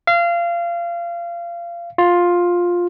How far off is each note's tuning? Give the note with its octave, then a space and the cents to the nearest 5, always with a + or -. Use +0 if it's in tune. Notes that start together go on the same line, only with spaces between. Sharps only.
F5 -25
F4 +10